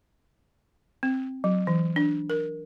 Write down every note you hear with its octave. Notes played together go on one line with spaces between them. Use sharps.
C4
F#3
E3
D4
A#4